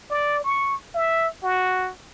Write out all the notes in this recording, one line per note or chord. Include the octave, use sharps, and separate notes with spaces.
D5
C#6
E5
F#4